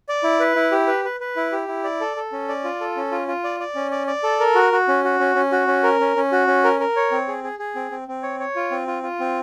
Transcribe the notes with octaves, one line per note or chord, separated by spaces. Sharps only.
D5
E4
B4
E4
G4
B4
B4
B4
E4
G4
E4
D5
A4
A4
C#4
D5
F4
A4
C#4
F4
F4
D5
D5
C#4
D5
D5
A4
A#4
F#4
F#4
C#4
F#4
C#4
C#4
F#4
C#4
A#4
C#4
C#4
F#4
C#4
A#4
A#4
C#5
C4
G#4
G#4
G#4
C4
C4
C4
C#5
C#5
F4
C4
F4
F4
C4